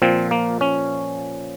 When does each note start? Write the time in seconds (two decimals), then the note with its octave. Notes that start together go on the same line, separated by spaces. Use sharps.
0.02 A#2 F3 C4
0.31 A#3
0.61 C#4